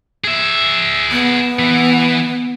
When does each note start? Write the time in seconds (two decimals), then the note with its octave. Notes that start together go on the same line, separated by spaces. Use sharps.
0.24 G#4 E5
1.11 B3
1.59 E3